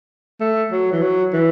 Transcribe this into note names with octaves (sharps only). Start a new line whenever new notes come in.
A3
F#3
E3
F#3
E3